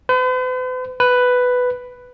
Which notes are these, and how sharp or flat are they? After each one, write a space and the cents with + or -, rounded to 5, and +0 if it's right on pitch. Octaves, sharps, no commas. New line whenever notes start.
B4 +45
B4 +5